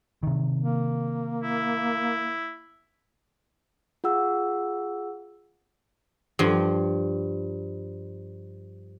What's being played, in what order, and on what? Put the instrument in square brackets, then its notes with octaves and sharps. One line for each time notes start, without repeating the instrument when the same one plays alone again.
[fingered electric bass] C3 D#3
[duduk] A#3
[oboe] E4
[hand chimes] F4 G#4 F#5 E6
[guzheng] G2 F3